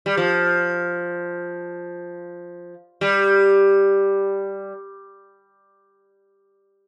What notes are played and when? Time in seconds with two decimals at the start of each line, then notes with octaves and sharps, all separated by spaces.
0.06 G3
0.17 F3
3.01 G3